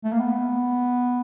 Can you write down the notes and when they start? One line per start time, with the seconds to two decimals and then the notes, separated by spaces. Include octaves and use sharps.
0.04 A3
0.13 A#3
0.20 B3